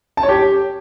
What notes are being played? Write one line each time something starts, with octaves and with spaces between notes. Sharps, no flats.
A5
C#5
G4